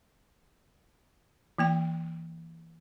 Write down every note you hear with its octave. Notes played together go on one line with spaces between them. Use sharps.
E3 A#3 G5